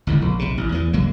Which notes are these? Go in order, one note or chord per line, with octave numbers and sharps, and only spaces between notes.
G1 C#2 A2
A#1
B1 C3
A1
E2 E3
C#2 G2 F#3 A#3